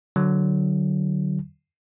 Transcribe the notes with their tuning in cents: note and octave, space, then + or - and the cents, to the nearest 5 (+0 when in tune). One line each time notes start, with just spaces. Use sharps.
D3 +15 F#3 +15